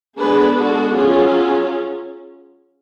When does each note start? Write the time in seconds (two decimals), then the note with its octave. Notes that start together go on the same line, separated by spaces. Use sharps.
0.19 D3 G#3 B3 D4 G#4 B4
0.57 F#4 A4
0.95 F#3 C#4 F4 G#4